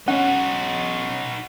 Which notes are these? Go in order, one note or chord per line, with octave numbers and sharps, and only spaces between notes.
C#4 D#4 F#4 F#5